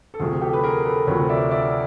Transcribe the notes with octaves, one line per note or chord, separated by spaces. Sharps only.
A4
D2 C3 F3 F#4 G#4
G4 A4
B4
G#4 A#4
A4 B4
D2 C3 F3 B4 C#5
D5 E5
D5 E5